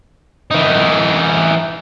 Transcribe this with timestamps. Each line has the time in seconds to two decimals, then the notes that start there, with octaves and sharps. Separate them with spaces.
0.51 E3 D#4